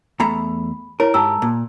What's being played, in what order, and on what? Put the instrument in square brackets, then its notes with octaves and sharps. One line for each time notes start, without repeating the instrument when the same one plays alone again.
[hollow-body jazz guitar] E2 A3 A#5 [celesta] B5
[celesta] E4 C#5 [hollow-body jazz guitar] A#4
[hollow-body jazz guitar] G#2 G4 [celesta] A5 A#5 E6
[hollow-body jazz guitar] A#2